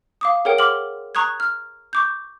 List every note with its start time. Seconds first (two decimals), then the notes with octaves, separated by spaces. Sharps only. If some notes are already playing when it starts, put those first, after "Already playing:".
0.21 F5 D6 D#6
0.45 G#4 A#4 C#5 F#5 G5
0.58 C6 D6 F6 F#7
1.15 A#5 C#6 D#6 F#6 G#6
1.40 F6
1.93 C#6 D6 G6